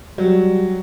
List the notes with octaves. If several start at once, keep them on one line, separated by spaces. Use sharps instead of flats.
F#3 G3